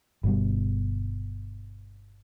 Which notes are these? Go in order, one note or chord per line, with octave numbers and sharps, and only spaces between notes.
G1 B2 G3